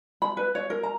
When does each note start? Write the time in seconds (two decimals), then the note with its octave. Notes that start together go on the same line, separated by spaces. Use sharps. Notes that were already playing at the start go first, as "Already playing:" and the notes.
0.22 B5
0.37 B4
0.55 C#5
0.70 A#4
0.83 A#5